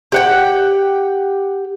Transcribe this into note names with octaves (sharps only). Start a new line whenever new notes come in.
G4 F#5 G5